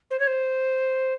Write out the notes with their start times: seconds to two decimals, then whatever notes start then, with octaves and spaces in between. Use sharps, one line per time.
0.10 C5
0.19 C#5
0.27 C5